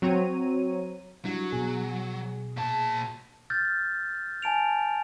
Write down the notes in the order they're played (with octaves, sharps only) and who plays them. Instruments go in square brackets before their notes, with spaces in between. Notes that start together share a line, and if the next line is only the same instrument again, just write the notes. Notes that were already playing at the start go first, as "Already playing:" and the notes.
[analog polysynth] F#3 C4 C#5 A#5 D#7
[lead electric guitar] F#3 [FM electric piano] G3 D4 E4
[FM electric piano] B2 G#4
[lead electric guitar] A#2 A5
[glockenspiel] F6 G6 A6
G#5 A5 D7 F7